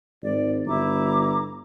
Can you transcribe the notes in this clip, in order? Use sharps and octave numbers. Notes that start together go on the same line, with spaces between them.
G#1 D5
G1 E4 A#5 D6